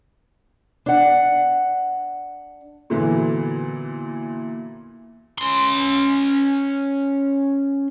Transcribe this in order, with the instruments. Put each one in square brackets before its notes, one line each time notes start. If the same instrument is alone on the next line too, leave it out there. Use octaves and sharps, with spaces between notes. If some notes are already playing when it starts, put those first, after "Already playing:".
[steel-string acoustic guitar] D4 F#5
[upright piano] A#2 D3 E3 F#3 B3
[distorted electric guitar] C#4 C6